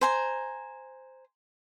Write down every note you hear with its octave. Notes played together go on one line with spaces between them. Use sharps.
C5 G#5 A#5